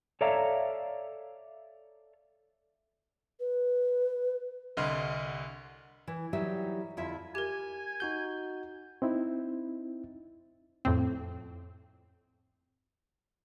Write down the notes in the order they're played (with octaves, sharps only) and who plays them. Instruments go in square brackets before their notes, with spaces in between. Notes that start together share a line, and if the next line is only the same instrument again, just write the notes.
[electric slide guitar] A4 C#5 D5 E5 F5 A#5
[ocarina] B4
[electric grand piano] C2 D3 D#5 B5 C6 F6
[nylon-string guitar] E3
E3 F#3 G3 D#4 G4 E5
F2 D3 E4 F4 E5
[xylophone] G4 A#4 [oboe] G#5
[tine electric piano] D#4 F#4 G6
[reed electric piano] C4 D#4 E4
[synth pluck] F2 A2 C4